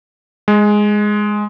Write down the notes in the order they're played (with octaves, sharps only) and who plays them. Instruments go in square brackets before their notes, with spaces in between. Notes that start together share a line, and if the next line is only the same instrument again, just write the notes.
[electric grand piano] G#3